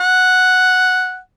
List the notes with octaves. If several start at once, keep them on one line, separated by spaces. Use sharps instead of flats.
F#5